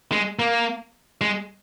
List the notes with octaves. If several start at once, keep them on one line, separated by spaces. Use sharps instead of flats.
G#3
A#3
G#3